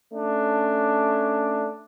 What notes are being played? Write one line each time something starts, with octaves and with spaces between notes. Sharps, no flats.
A3 C#4 D4